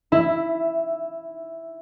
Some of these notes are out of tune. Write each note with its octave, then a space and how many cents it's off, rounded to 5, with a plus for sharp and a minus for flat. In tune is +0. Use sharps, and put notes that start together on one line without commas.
E4 +0 E5 +20